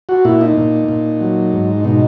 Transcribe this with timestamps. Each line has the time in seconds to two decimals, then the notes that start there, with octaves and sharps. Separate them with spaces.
0.09 F#4
0.25 A#2 E4
0.41 D#4
0.57 A#2
0.88 A#2
1.21 F#3
1.53 G#2
1.84 B2 D#4